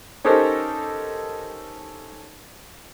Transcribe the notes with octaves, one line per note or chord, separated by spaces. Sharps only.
C#4 D#4 G4 A4 A#4 C5